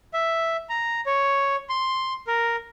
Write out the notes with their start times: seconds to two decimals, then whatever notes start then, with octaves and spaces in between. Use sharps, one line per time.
0.14 E5
0.69 A#5
1.06 C#5
1.69 C6
2.27 A#4